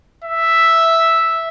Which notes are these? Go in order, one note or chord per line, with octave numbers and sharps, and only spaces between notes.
E5